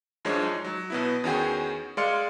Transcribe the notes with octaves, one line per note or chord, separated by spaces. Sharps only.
F#2 F3 G#3 D4 C#5
D#4
F#3
B2 B3 E4
E2 D#3 C#4 F#4 G#4 G5
G#3 D5 F5 C6 F6 C#7